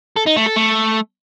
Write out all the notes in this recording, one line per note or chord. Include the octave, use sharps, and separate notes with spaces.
A4
D#4
A3
A4
A3